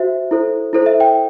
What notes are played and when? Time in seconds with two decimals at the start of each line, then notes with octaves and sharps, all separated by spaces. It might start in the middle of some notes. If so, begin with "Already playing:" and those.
Already playing: F#4 C5 E5
0.31 E4 A4 C5
0.73 E4 A4 C5
0.86 E5
1.00 G5